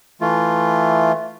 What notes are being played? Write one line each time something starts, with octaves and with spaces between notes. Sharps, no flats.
E3 A3 F4